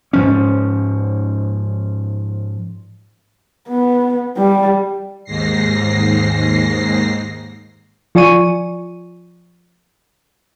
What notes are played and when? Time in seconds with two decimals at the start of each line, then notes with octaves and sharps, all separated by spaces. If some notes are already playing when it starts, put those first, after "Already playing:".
0.13 G#2 F3 C#4
3.68 B3
4.37 G3
5.24 D#2 G#2 A#6 C7
8.15 F3 F4 D5 G#5 C#6 D#7